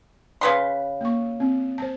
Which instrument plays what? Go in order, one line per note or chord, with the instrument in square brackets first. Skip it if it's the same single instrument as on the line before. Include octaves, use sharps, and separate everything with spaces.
[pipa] C#3 B4 C6
[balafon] A#3 C#6
C4
C5 A5